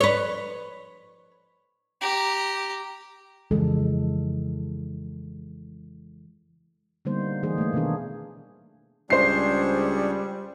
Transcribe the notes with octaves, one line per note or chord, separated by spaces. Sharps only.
B4 C#5
G4 A#5
F2 C#3 E3 G#3 A4
D3 G3 A#3 B3 D#4 C5
E3 A#3 D#4 G#4 C5
A3 A#3
B2 D#3 B3 D4 G#4
C#2 G3 D4 G#4 C5 C#6 C7